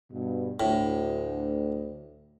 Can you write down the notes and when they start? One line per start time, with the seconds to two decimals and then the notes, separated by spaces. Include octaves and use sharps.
0.13 G2 B2
0.60 D2 A2